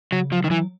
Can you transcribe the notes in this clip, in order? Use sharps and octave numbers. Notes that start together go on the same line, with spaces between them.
C#3 F#3
F3 F#3
D#3
E3 F#3